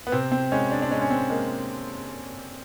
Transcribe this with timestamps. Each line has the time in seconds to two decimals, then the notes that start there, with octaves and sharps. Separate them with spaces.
0.07 B3
0.12 C3 C4
0.32 C4
0.52 G#3 C#4
0.71 D4
0.82 D4
0.91 G#3 C#4
1.01 C#4
1.11 C4
1.30 G#3 A#3